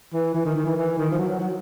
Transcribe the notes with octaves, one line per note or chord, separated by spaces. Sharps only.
E3
E3
D#3
D#3
E3
E3
D#3
F3
F#3
F#3
F#3